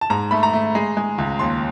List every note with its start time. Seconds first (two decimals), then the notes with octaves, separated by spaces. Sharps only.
0.01 A5
0.10 G#2 A#5
0.31 A3 B5
0.43 A#5
0.53 A3
0.75 G#3
0.97 G#3
1.18 C#2
1.39 D#2 C6